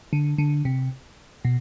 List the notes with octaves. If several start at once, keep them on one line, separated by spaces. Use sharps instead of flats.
D3
D3
C3
B2